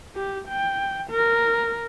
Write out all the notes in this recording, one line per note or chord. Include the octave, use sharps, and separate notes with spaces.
G4
G5
A#4